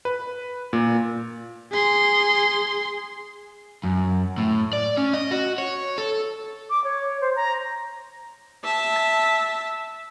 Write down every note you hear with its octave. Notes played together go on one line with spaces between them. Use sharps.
B4
A#2
G#4 C6
F#2
A2
D5
C#4
D#5
F#4
C#5
A4
D6
C#5
C5
A#5
E5 A5